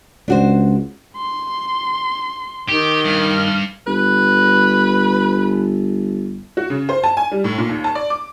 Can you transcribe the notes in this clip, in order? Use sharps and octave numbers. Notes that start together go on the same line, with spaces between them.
C#2 D4 F#4 C5
C6
D#3 G4
G2 F6
G1 B4
F#4
C#3
C5
A5
G#5
G3
A2
A#2
D#2
A5
D5
D6